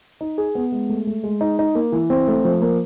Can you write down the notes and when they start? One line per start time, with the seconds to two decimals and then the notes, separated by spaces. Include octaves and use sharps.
0.21 D#4
0.38 G#4
0.55 B3
0.72 G#3
0.89 A3
1.07 A3
1.24 G#3
1.41 D#4
1.59 D#4
1.75 A#3
1.92 E3
2.10 C4
2.27 A3
2.45 F3
2.62 A#3